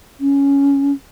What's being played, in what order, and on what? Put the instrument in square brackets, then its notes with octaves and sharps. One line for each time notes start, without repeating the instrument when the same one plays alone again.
[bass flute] C#4